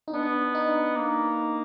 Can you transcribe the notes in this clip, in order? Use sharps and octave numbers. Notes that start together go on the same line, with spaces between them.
D#4
B3 D4
D#4
A#3